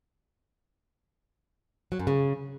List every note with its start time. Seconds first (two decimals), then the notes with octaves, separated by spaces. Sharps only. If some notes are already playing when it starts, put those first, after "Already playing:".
1.92 F#3
1.99 F#2
2.07 C#3